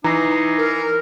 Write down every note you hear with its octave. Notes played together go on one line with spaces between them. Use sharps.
E3 D#4 A#5 A#6 C7
A#4